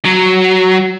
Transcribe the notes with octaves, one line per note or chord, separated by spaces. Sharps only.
F#3